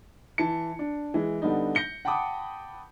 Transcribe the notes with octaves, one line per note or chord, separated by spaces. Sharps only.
E3 A5 C#7
D4
E3 G#3
D3 G3 B3 D4 D#4
G6 A#6 C#7 G7
F#5 G5 A5 B5 D6 D#6